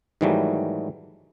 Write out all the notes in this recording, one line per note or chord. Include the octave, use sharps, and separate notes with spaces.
G#2 D#3 E3 F#3 G3 A3